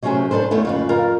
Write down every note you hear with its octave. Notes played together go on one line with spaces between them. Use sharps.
C3 F#3 A3 C#4 G#4 C5
D4 G4 A4 B4 C5
E2 A3 B3 E4 C#5
F2 C#3 B4
F2 F4 A#4 F5